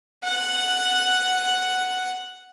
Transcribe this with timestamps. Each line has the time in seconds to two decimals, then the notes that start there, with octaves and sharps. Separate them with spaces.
0.24 F#5 F#6